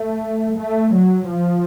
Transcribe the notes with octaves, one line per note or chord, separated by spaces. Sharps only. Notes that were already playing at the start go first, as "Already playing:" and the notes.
Already playing: A3
A3
F#3
F3